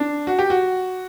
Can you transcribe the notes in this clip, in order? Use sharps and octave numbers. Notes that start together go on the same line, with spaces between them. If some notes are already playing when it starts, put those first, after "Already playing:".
Already playing: D4
F#4
G4
F#4